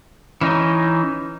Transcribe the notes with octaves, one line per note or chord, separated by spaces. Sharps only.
E3 C#4 D#4